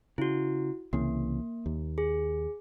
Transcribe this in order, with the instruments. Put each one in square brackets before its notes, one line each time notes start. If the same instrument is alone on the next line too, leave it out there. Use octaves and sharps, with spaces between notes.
[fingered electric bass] C#3 [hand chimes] E4 F#4
[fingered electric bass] C2 C#3 E3 [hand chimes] A#3
[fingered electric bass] D#2
[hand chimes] G#4